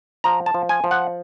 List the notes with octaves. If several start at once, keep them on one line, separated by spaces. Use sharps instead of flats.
F3 A#5
A5
F3
G#5
F3
F#5